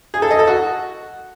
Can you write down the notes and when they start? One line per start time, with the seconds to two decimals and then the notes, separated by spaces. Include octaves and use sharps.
0.14 G#4
0.22 A4
0.31 D#5
0.39 A4
0.47 F#4